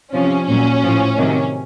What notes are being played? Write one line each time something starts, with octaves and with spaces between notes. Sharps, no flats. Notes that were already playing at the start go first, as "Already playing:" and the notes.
C3 F3 C#4
A#2 F#3 C#4
A2 F3
C3 D#3 F#3